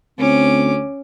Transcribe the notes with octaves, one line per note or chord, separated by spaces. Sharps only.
D2 C4 C#4 D6